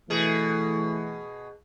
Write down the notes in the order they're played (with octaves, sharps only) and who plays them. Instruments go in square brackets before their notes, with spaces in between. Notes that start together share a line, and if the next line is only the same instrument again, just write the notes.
[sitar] B2 G#4 [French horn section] E3 A3